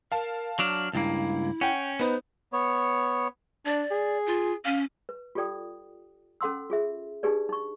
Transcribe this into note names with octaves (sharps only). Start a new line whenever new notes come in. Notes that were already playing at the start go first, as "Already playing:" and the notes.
A#4 F5 A5
F#3 D4 F6
C#2 G2 A#3 E4
C#4 F#5 G5
B3 D#4 B4 C5
B3 C#5
D4 D5
G#4
F4
C#4 F5
B4
F4 G4 A4 D5 G5 D#6
C#4 A4 F#5 C6 E6
F4 G#4 E5
D4 D#4 G4 G#4 B4 D5
D#4 C#6